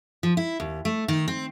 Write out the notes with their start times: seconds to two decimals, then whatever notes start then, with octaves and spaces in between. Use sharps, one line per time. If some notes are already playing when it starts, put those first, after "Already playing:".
0.23 F3
0.37 E4
0.60 D#2
0.85 A3
1.08 D#3
1.28 C4